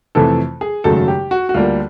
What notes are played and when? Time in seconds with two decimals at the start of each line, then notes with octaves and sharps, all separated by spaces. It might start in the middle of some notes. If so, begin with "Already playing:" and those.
0.15 F2 C3 E3 A3 A4
0.61 G#4
0.84 G#1 F#2 C#3 F#3 A3 A4
1.08 G4
1.31 F#4
1.49 F#4
1.54 D2 D3 G3 A#3 F4